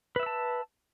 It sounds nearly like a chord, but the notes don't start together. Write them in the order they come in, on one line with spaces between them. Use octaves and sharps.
B4 E5 E6 A5